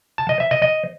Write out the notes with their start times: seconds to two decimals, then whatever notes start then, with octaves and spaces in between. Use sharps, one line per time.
0.18 A5
0.29 D#5
0.40 E5
0.51 D#5
0.62 D#5